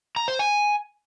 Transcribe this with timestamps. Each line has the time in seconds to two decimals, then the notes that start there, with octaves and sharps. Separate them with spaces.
0.16 A#5
0.28 C5
0.39 G#5